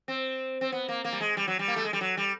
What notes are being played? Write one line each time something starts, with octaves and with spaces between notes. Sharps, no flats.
C4
C4
B3
A#3
A#3
G3
G#3
G3
F#3
G3
A#3
A3
G#3
G3
F#3
G3